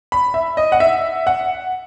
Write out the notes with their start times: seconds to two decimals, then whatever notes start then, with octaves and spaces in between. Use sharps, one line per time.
0.12 B5
0.34 E5
0.57 D#5
0.72 F#5
0.80 E5
1.27 F#5